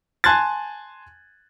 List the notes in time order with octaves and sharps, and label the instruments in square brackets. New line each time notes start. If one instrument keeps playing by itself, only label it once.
[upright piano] G#5 A5 C6 F#6 G#6 A6